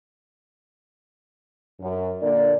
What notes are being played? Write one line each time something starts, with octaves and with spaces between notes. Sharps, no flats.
F#2
A#2 D3 A#3 D5